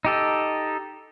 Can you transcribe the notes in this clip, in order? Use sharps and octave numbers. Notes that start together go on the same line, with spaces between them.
D#4 G4 A4